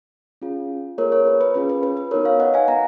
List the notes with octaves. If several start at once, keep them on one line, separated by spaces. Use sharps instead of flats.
C#4 F4 G#4
A#3 F4 G#4 A#4 C#5
A#4 C#5
B4
B4
C#4 F4 G#4 B4
B4
B4
B4
B3 D#4 F#4 A#4 C#5
C#5 F5
D#5 F#5
F5 G#5
B3 F#4 F#5 A#5